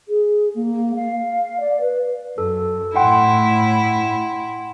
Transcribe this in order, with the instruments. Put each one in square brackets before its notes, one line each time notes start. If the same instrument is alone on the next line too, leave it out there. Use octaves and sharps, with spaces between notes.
[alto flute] G#4
A#3
F5
D5
B4
[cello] F#2 [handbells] A4
[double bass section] A2 [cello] E4 [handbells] F#5 G5 C6